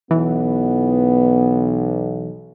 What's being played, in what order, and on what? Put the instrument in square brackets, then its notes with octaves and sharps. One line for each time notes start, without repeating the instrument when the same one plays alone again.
[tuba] B1 [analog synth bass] E3 [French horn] B3